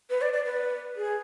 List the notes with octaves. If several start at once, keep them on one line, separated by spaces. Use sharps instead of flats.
B4
D5
D5
B4
G#4